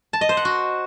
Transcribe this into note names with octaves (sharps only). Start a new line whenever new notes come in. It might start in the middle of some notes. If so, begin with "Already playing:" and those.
A5
D#5
C5
F#5
F#4